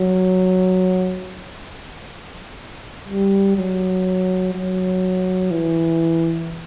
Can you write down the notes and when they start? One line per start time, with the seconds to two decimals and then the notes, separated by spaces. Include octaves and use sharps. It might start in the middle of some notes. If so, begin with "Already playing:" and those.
Already playing: F#3
3.08 G3
3.57 F#3
4.54 F#3
5.51 E3